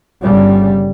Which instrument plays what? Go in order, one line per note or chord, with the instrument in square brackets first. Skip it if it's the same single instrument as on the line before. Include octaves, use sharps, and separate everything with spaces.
[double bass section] G1 C#3 G3